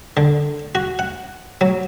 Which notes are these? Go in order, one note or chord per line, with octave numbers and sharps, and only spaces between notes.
D3
F#4
F#5
F#3